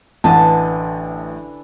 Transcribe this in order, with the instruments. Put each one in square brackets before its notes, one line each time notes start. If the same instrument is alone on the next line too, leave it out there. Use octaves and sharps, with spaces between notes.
[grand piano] A1 [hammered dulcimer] D3 E3 [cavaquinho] D#5 A5